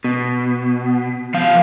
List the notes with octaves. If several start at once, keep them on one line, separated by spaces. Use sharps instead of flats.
B2
C3 F3 F5